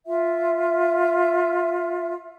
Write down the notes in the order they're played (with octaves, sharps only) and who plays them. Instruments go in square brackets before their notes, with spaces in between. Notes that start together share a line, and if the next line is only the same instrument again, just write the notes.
[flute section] F4 E5